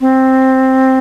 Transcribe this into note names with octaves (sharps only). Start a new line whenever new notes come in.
C4